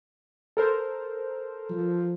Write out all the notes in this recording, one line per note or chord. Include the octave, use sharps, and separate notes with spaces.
A4 A#4 C5
F3